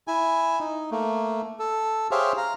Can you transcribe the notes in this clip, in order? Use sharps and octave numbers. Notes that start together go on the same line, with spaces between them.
E4 G#5
D#4
A3 A#3
A4
G4 G#4 C5 C#5 E5 F5
F5 A#5